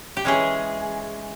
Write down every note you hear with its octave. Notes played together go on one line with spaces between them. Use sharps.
G4
E3 G#3 C#4 G#4